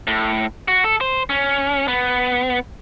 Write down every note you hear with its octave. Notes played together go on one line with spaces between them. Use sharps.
A2
F#4
A4
C5
C#4
B3